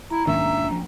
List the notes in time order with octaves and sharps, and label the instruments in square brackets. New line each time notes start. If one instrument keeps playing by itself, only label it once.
[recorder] E4 [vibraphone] A#5
[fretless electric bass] B1 G#2 D#3 [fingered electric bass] A#3 C#4 D4 [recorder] E5
[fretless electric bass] F3